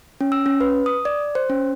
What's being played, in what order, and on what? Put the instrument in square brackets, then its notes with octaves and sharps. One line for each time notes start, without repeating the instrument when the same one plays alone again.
[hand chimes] C#4
E6
C#4
B4
D#6
D5
C5
C#4